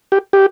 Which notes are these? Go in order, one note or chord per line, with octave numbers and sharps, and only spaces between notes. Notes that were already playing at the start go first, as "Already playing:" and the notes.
G4
G4